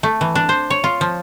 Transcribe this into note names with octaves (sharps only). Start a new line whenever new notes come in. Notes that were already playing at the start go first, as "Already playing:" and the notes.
A3
E3
D4
C5
C#5
F4
F3